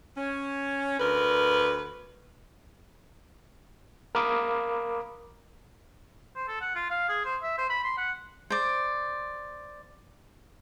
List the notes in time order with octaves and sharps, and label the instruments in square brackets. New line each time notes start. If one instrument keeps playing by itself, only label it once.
[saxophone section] C#4
D2 A#4 B4
[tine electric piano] A#4 F5 B5 D6 D#6
[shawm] C5
A4
F#5
F4
F5
G#4
C5
E5
C5
B5
C6
F#5
[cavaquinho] C5 D5